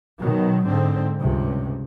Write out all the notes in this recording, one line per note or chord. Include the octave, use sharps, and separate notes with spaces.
B2 D#3 F#3
G#2 D3 C4
C#2 G2 C3